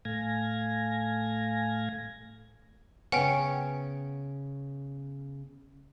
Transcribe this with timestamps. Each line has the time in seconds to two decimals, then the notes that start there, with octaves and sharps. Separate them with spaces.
0.05 A2 A3 F5 G#5 G#6 A#6
3.12 C#3 B3 C#4 F#5 G5